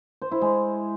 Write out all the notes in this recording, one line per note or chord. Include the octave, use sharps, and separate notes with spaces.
C5
E4
G#3